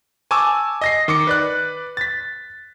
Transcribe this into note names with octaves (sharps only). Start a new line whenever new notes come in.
G#5 A5 C#6 D6 E6
D#5 A#6 C7
D#3 D6 C#7
B4 D5 F#6
A6 B6